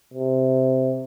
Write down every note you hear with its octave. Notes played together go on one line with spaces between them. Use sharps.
C3